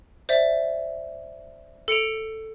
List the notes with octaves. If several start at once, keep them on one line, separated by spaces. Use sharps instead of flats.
C5 D5 E5
A4 C#7 D7 F7